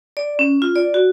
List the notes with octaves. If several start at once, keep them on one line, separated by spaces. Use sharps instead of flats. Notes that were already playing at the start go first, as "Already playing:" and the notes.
D5
C#4
F4
D5
F#4